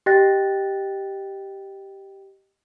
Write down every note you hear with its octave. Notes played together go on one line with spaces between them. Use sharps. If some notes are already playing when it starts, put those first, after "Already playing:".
G4 D#5 G5 F#6 A6 A#6